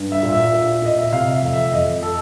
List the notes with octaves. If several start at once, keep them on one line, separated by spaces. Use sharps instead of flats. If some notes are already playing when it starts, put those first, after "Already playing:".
Already playing: G2
E5
A#2
E5
A#2
A#2 D#5
E5
C3 F5
E5
F2
E5
F2 D#5
A4